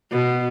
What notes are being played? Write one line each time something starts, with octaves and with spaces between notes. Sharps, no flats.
B2